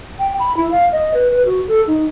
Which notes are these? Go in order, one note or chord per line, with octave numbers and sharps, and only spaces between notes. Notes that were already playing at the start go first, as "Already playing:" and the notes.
G5
B5
E4
F5
D#5
B4
B4
F#4
A4
D#4